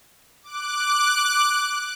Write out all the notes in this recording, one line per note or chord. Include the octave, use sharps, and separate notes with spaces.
D6 F#6